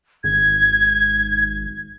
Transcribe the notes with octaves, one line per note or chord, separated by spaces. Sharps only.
G#1 G#6